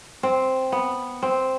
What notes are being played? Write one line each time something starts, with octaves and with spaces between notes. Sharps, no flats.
C4
B3
C4